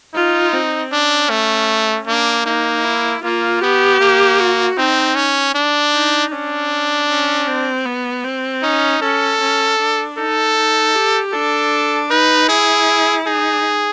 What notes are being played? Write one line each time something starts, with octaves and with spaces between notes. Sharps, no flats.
D#4 F4
C4
C#4 D4
A3
A#3 D4
A#3 D#4
E4
A#3 F4
B3 G4
A#3
F#4
C4 D#4
C#4
D4
D#4
C#4 D4
C#4
C4
B3
C4
C#4 D#4
C#4 A4
C#4
D4
D#4 A4
D#4
G4
D4 A4
D#4 B4
E4 G#4
D#4 G#4